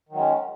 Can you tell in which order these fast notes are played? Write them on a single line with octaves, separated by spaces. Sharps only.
D#3 F#3 G#3 C#4